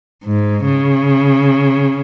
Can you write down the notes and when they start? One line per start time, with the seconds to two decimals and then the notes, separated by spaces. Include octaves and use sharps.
0.24 G#2
0.65 C#3